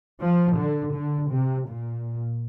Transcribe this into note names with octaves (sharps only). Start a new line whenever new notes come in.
F3
D3
D3
C3
A#2